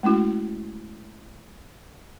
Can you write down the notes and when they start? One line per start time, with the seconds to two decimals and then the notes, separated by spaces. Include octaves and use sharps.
0.03 G#3 A3 C#4 E4 F#4